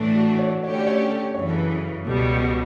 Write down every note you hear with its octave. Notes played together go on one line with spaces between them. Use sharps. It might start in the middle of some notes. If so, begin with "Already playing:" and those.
Already playing: A2 E3 A3 D4
F#4
C#5
D3 A3 C#4 G4 C#5
D5
C#5
A4
F#2 C#3 E3 C#5
A4
B4
C#2 B2 G3 A4
F#4